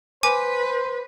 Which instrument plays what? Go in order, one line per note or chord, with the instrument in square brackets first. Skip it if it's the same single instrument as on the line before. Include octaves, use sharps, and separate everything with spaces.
[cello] B4 [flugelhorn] C5 [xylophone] G#5 D6